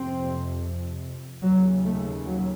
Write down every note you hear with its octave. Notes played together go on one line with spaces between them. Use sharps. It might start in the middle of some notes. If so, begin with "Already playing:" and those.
Already playing: F2 C3 C4
D#2 C#3 F#3
A3
F#3